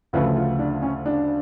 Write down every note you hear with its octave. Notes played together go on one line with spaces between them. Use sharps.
D2 C#3 F3 A3 B4
F4
D4
C#4
D4